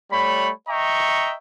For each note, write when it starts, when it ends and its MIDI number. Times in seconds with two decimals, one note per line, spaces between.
0.11 0.51 55
0.11 0.51 57
0.11 0.51 73
0.11 0.51 83
0.69 1.34 75
0.69 1.34 76
0.69 1.34 79
0.69 1.34 82
0.69 1.34 85